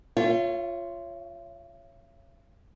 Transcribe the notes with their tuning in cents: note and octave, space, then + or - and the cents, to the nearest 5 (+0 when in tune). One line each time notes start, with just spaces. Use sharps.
F4 +0 C#5 -5 E5 +45